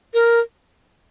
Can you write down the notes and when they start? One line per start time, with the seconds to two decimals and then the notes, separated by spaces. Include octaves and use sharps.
0.14 A#4